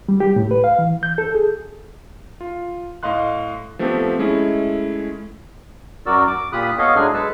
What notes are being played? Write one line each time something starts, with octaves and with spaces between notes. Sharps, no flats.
G3
G4
A2
B4
F5
E3
G6
A4
G#4
F4
A2 D#5 F5 C6 F#6
F3 A3 B3 C4 G4 A4
G#3 A3 C#4 E4
F#2 F#4 A#4 D5 E6
D6
A#2 F4 G4 B5 D#6 F#6
B3 A4 C#5 D#5 F5
A2 F#3 G#3 D4 G#4 G#5
G#3 A4 B4 A5 E6